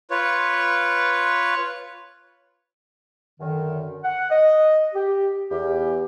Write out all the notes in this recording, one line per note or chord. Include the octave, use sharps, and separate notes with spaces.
F4 B4 C#5
F#2 D3 D#3
F#5
D#5
G4
E2 G4